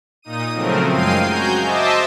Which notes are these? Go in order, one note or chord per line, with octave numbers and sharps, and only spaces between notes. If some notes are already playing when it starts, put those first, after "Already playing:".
A#2 D#4 D#6 D#7
C#3 F3 F#3 A3 C4 A#4
F#2 G#3 F5 G5 C7 D#7
F#4 G#5 A#5 G6
C5 D#5 E5 A5 D6 E6